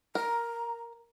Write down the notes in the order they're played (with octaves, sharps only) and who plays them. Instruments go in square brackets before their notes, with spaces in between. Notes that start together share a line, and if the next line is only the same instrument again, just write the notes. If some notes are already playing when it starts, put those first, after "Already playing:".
[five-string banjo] A#4 [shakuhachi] A#5